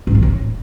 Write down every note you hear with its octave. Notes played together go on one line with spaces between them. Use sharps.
G#2
E3
A2